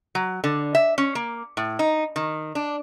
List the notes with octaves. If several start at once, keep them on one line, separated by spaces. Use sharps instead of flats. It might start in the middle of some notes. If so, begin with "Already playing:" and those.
F#3
D3
E5
C#4
A#3
A2
D#4
D#3
D4